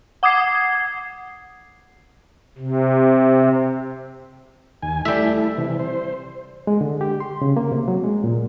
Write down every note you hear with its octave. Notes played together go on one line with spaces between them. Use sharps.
F#5 D6 D#6 G#6 C7
C3
D#2 G#5
G3 A3 E4 E5
C3 E3
C5
G#3
D3
G4
C6
C#3
A#3
C3
F#3
G#3
A#2